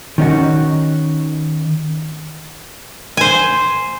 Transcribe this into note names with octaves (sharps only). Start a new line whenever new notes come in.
D#3 C#4 D#4 F#4
C5 G#5